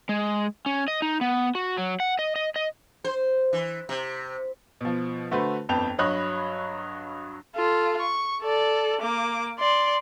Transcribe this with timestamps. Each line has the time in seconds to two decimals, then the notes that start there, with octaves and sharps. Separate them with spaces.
0.09 G#3
0.66 C#4
0.88 D#5
1.02 D#4
1.21 B3
1.55 F#4
1.78 F#3
2.00 F#5
2.19 D#5
2.36 D#5
2.56 D#5
3.04 C5
3.53 E3
3.89 C3
4.81 B2 F3
5.31 D3 A3 F#4 B4 C5
5.69 G1 F2 B4 G5 A5 F7
5.98 G2 F#3 C#5 D#5 B5 F#6
7.55 F4 A4
8.01 C#6
8.42 A4 D5
9.01 A#3 D6
9.59 D5 C6